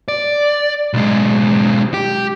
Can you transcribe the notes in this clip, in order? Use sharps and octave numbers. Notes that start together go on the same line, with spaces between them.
D5
B1 G#3
G4